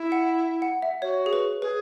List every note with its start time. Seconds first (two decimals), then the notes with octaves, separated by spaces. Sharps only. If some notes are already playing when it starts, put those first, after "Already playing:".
Already playing: E4
0.12 F#5
0.62 F#5
0.82 E5
1.02 F#4 C#5
1.26 G#4
1.33 B4
1.62 G#4 B4